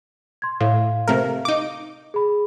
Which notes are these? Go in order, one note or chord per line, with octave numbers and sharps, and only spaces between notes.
C6 G#6
A2 F5
C3 A3 A#4
D#4 D6
G#4 B5